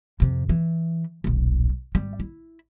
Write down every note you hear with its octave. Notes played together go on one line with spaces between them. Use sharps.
F2 C3
E3
D#1 B1
G#1 G3
E4